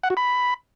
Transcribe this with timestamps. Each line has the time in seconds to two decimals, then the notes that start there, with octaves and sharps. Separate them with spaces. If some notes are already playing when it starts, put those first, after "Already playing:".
0.03 F#5
0.10 F#4
0.17 B5